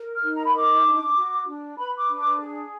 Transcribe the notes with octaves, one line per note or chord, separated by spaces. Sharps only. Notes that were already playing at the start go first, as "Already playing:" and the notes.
Already playing: A#4
F6
D#4
A#5
B5
A#4 D6
D4
F#4
D4
B4 B5
D6
D4
D6
G#4